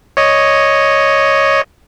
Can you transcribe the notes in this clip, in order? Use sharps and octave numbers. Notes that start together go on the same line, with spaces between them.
C#5 D#5